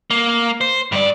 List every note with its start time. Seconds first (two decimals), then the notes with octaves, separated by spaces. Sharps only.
0.10 A#3
0.61 C5
0.92 G2 D5